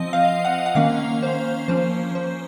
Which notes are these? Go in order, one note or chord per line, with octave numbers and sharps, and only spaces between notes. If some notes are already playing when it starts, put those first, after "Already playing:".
Already playing: F3 C4 D#5
F5
F#5
F#5
D#3 A#3 C#4 F5
C5
F3 A#3 C#4 C5
C5